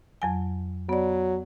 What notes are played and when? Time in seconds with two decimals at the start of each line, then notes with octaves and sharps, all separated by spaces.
0.22 F2 F#3 G#5
0.89 F#3 B3 D5